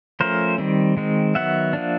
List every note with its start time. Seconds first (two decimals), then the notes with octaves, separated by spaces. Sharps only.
0.20 F3 A3 C#4 A#4 C5
0.58 D#3 G3 C4
0.97 D#3 G#3 C4
1.35 D#3 F#3 B3 E5 F#5
1.73 F3 A#3 D4